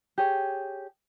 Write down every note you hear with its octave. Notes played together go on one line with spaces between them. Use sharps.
G4 G#4 C#5